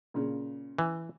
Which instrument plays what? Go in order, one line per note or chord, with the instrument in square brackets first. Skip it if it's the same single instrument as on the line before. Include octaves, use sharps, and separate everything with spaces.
[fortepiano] A#2 C#3
[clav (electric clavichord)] E3